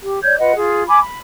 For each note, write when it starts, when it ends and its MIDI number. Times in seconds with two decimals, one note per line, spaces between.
0.03 0.22 67
0.23 0.35 73
0.23 0.35 74
0.23 0.35 91
0.23 0.35 92
0.39 0.53 65
0.39 0.53 71
0.39 0.53 75
0.39 0.53 78
0.57 0.82 65
0.57 0.82 68
0.89 0.98 80
0.89 0.98 83
0.89 0.98 86
1.01 1.19 83